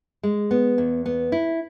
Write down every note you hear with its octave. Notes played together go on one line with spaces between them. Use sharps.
G#3
B3
E2
B3
E4